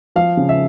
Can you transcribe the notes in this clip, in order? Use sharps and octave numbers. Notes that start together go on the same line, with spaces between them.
F3 F5
C#3
E5